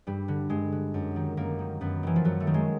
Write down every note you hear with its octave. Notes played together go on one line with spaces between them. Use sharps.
G2 G3
D3
G2 G#3
D3
F#2
D#3
F#2 A#3
D#3
F#2 B3
D#3 E3
F3
F#2 F#3
A3
D#3
G#3